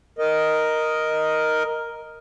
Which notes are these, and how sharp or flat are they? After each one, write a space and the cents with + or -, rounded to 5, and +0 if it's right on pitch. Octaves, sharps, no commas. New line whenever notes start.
A#4 +5 D#5 +0